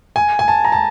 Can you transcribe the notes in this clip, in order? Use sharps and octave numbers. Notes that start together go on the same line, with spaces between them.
G#5
G#5
A5
A#5
A5